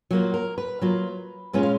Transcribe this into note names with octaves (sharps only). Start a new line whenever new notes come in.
F#3 A#3 F4 F#4
A#4
B4
F#3 A#3 F4
A#2 G#3 C#4 F4 B4
F5